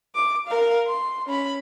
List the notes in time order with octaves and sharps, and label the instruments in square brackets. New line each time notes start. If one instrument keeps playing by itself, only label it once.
[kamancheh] D6
A#4 F5
C6
C#4 B5